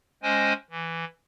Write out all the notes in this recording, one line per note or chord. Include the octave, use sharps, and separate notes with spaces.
G#3 C#4 C5 D#5 G5 G#5
E3